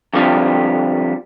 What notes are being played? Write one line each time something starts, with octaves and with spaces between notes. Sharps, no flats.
F2 D3 F3 G3